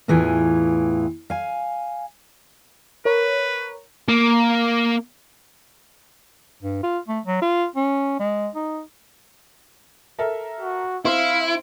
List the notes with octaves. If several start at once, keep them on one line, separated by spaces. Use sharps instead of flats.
E2 A2 E3 F4 G#4 G#5
F5 G#5
A#4 B4 C#5
A#3
G2
F4
A3
F#3
F4
C#4
G#3
D#4
A4 A#4 E5
F#4
C4 E4 F5 C6